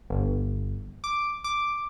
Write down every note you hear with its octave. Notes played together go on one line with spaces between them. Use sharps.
G1
D6
D6